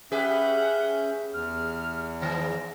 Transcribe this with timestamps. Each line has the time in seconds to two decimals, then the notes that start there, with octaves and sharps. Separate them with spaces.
0.12 C#4 G4 G#4 B4 E5 F#5 G6
1.33 E2 F6
2.21 G#2 D#3 E3 A#6